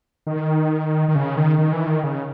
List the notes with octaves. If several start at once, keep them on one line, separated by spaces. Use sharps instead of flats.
D#3
D#3
C#3
D#3
D#3
E3
D#3
C#3